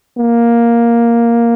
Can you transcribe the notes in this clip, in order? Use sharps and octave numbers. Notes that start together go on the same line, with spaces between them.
A#3